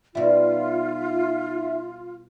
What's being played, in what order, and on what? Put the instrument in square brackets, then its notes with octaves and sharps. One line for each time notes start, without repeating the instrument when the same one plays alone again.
[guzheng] B2 G3 [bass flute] D#4 [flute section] F4 [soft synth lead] E5